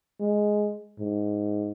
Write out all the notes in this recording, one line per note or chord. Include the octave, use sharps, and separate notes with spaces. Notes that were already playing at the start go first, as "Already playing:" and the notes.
G#3
G#2